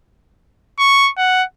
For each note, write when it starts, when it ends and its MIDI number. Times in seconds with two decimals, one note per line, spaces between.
0.79 1.10 85
1.17 1.44 78